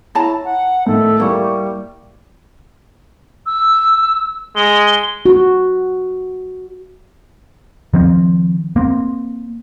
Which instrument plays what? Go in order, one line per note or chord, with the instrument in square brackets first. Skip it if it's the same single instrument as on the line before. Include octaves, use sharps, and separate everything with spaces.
[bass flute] E4 [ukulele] C#5 A5 A#5
[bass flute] F#5
[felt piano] A2 D#3 [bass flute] A4
[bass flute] G3 [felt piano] A#3 C#6 [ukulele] E4
[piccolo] E6
[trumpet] G#3 [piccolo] G7
[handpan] F#4
[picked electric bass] D#3 F3 C4
A#3 C4